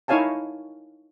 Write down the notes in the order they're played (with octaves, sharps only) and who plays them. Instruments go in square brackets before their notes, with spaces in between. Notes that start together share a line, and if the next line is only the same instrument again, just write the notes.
[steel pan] D#4 E4 C#5 F5 G#5 A5